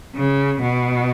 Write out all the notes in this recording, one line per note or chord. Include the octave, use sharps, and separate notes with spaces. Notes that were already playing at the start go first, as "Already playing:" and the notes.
C#3
B2